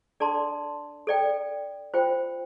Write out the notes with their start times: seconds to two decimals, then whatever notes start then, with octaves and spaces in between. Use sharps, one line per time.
0.20 D4 A4 D5 A5 C6
1.07 A4 D5 G5
1.94 F4 C5 G5